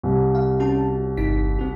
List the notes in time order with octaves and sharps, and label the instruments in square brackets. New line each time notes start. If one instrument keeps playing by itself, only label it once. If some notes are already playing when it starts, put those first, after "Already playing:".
[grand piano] C2
[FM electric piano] F5
C#4 F#4 A5
G1 D#4 B6
C4 F#4